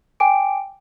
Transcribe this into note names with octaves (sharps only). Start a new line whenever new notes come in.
G5 G#5 D6 D7